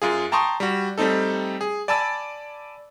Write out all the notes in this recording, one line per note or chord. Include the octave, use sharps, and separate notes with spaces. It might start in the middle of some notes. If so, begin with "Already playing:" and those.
F#2 F4 G#4
G5 A5 A#5 C6 C#6 D#6
G3 F#4
G3 A3 C4 D#4 A4
G#4
D5 G#5 A5 B5 E6 A6